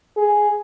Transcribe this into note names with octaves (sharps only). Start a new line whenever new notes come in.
G#4